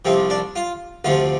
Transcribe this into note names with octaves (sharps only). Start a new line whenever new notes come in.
C2 C3 F3 C4
D4
F4
D2 C3 F3 F4